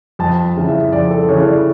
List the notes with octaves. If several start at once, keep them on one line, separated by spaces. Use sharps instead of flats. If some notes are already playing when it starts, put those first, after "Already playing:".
F2 A5
C#3 E3
E5
F2 D5
A4
C#3 E3 C#5
D5